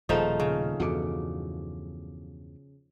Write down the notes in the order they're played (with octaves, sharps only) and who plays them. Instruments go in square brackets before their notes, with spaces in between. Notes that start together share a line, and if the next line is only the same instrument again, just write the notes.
[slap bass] D#1 B2 [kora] F3 A3 D#4 [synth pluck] G#4 A4 D#5
[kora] C#3
[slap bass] E2 G2 B2 [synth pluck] F#4 A4 D6